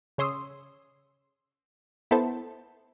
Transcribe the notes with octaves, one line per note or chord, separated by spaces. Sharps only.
C#3 C#5 C6 D#6 E6
B3 E4 A4 C5 A5